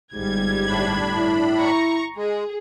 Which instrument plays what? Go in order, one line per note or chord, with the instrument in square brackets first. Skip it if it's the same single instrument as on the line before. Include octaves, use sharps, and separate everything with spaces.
[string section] G1 G3 G#6 [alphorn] G#2
[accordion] A2 D4 B5
[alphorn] E4
[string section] A#5 C#6
[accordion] G#3 [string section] G#4